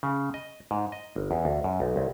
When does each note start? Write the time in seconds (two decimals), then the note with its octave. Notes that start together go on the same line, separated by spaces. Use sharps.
0.03 C#3
0.34 D#5
0.71 G#2
0.92 D#5
1.16 G1
1.31 E2
1.45 D2
1.64 F#2
1.80 B1
1.96 C2